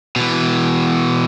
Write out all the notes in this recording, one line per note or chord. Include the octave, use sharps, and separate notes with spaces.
B2 E3